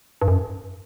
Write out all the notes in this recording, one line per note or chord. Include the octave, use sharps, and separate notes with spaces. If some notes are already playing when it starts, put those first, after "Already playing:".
G2
F#2